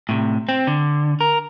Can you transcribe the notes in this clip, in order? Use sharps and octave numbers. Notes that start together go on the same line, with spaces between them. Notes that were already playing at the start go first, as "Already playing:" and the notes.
A2 C3
C4
D3
A#4